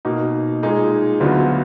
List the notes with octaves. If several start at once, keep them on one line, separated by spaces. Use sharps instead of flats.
B2 A#3 D#4
A#2 G#3 D#4 G#4
D2 D3 F#3 B3 F4